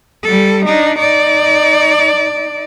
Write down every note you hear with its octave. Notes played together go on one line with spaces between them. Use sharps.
G3 A4
D4 D#4
D#4 D5